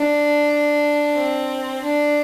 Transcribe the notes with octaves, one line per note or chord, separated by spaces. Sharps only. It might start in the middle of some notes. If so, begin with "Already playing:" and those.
Already playing: D4
C4
D4